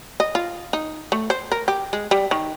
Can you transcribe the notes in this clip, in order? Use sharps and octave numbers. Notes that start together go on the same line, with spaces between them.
D#5
F4
D#4
A3
C5
A#4
G4
G#3
G3
D#3